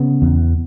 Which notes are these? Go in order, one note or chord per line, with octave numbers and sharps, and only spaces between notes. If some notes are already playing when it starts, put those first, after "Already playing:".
Already playing: C#3 B3
E2